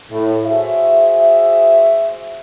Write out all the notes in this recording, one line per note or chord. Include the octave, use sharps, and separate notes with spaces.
A2
F#4 G#4 C5 E5